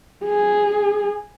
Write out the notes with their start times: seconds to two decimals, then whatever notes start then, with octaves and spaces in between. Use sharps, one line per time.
0.25 G#4